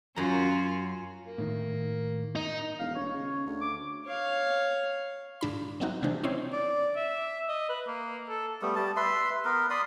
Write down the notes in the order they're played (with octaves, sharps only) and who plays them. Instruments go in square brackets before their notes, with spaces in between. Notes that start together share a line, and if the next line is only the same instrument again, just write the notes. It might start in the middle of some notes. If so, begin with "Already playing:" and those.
[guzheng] F#2 A#5 [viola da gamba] C#4 F4 F#4
[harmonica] A#3
[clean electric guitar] A2 D#3
[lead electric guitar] D#4
[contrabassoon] E1 [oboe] F5
[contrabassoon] D#1 [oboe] C#5
[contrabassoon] C#3
D2
[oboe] D6
[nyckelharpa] C#5 F5
[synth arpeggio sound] G#2 D4 B5
F#3 G3 A#3 C4 D#4 F#4
C3 E3 G#3 C4 D4
C4 C#4 D#4 E4 C5 C#5
[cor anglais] D5
E5
D#5
B4
A#3
A4
[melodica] G3 A3 B3
G3 A5
B4 E5 C6
B3 A#4 B4
D5 B5 C6 D#6